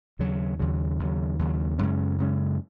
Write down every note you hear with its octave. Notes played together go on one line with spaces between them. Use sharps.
D#2 C#3 F#3
D#2 C#3 F#3
D#2 C#3 F#3
D#2 C#3 F#3
F#2 C#3 G#3 C#4
F#2 C#3 G#3 C#4